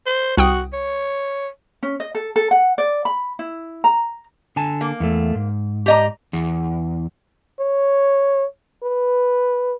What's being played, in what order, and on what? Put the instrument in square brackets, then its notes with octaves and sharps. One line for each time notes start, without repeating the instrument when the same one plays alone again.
[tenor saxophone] C5
[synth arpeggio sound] C2 G5 D#6 [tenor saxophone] F#4
[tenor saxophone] C#5
[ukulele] C#4
D#5
A4
A4
F#5
D5
B5
E4
A#5
[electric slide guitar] D3 G#5 A5
[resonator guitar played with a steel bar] A#3
[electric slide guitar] E2 A3
G#2
[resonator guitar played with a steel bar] G4 D#5 A#5
[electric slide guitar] E2
[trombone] C#5
B4